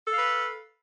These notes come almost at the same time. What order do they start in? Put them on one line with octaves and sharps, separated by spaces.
A4 F5 B4